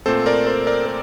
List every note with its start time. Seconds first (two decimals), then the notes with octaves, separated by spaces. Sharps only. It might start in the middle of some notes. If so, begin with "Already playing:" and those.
0.06 A#2 A3 C4 A4 C5
0.26 A#4 D5
0.46 A4 C5
0.67 A#4 D5
0.86 A#4